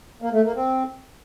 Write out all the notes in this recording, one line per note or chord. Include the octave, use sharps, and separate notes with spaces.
A#3
A3
A#3
C4